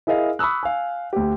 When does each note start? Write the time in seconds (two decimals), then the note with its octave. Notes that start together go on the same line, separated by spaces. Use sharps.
0.07 E4 G#4 A#4 D#5 F5
0.39 B5 C#6 D#6 E6 F#6
0.63 F5 G#5
1.13 D2 G4